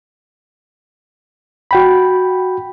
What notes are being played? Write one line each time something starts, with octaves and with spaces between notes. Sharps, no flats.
F#4 G5 B5